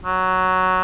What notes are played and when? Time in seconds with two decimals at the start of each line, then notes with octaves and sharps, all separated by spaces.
0.05 F#3